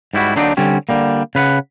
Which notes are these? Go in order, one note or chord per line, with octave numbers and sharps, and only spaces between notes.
G#2 G3 E4 F#4
D3 F#3 A#3 C4 D4 D#4
D3 G3 C4 C#4
D3 G3 A#3
C#3 B4 F5 F#5